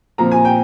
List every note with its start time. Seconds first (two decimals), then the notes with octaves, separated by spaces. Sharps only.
0.18 A#2 F3 C4 A#5
0.32 G#5
0.45 G5